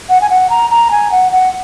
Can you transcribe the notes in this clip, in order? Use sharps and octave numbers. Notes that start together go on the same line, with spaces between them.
F#5
G#5
F#5
A#5
A#5
G#5
F#5
F#5